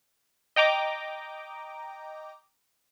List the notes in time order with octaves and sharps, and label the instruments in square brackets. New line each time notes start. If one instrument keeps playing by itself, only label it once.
[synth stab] D#5 G5 A#5 D6